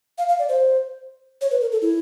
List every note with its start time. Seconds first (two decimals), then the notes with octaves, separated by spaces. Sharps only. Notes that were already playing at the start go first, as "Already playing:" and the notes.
0.18 F5
0.29 F5
0.39 D5
0.49 C5
1.41 C#5
1.51 B4
1.61 A#4
1.72 A4
1.82 E4